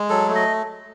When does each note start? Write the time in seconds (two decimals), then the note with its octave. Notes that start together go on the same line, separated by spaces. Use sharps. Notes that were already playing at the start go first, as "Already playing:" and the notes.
Already playing: G#3
0.10 F#3 A4
0.29 A3
0.35 D#5